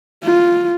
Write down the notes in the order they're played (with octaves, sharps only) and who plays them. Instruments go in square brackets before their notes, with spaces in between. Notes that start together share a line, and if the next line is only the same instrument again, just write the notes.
[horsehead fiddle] F4